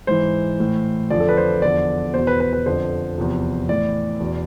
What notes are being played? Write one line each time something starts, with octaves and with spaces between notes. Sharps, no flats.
G#2 E3 C5
A2 E3
F2 D3 F3 D5
A4
B4
C5
E2 D3 F3 D5
E2 B2 C5
B4
B4
B4
F2 D3 F3 C5
E2 C3 F3
A2 E3 D5
E2 B2